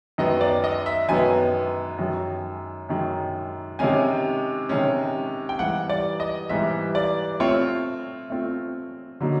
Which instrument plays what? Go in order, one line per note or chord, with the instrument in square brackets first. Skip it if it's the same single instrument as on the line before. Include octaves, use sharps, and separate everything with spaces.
[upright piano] F#2 D#3 G#3 B3 [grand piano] D#5
[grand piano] D5
D#5
E5
[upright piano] F#2 D#3 G#3 B3 [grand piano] G#5
[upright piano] F#2 D#3 G#3
F#2 D#3 G#3
[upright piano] C3 D#3 G#3 C#4 [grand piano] G#5
[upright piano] C3 D#3 G#3 C#4
[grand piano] G5
[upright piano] G#2 E3 G3 [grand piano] F#5
[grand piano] D5
D#5
[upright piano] G#2 E3 G3 [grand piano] E5
[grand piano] D5
[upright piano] A3 C4 F4 [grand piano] C#5
[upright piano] A3 C4 F4
D3 F#3 A#3 D#4